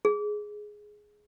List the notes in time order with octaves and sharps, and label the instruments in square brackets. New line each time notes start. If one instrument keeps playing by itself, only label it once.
[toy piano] G#4